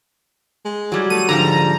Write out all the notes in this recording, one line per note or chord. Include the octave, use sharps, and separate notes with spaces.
G#3
F#3 G3
A3 D#7
G#2 D3 F3 G3 A#5